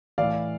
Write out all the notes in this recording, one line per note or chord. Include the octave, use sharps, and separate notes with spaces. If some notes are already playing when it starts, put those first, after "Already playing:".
A2 E3 D5 F5